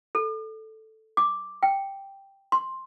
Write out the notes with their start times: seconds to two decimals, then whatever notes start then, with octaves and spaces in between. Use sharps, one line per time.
0.15 A4
1.17 D6
1.63 G5
2.52 C6